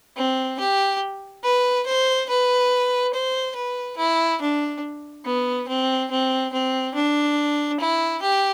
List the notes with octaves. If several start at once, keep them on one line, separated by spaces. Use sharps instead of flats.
C4
G4
B4
C5
B4
C5
B4
E4
D4
B3
C4
C4
C4
D4
E4
G4